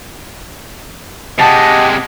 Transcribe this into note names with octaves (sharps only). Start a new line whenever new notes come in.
C3 G#3 G4 D#5 F#5 A5 B6